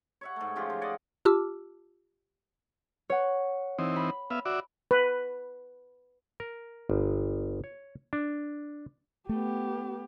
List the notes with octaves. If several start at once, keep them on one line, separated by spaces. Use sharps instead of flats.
C#5 E5 F#5
G#2 A3
C#3 F3 F4 G4
F3
D5 D#5 F#5 G#5
F4 G4 A5 D6 E6 F6
C#5 F#5
E3 C4 D#4
B5
B3 E5 F5
F#4 D5 E5
B4
A#4
G1
C#5
D4
A3 B3 G4